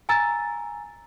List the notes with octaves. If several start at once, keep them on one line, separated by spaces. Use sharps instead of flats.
G#5 A#5 E6 A6